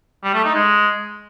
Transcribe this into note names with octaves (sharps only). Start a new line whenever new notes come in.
G3
A3
D#4
G#3